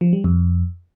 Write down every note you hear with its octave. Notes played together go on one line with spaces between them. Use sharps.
F3
G3
F2